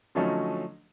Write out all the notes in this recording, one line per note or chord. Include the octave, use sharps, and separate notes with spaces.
D3 F3 F#3 A3 C#4 D#4